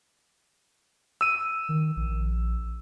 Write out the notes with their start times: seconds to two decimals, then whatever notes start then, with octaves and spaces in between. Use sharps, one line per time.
1.21 E6 D#7
1.69 D#3
1.96 A#1